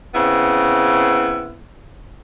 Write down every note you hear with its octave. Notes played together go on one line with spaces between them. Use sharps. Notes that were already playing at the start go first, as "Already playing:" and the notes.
C#3 B3 C4 E4